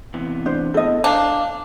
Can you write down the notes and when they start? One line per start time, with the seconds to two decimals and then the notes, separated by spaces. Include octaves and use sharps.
0.14 C3 E3 B3
0.46 D4 C5
0.74 B3 E4 A4 D#5
1.04 D4 F5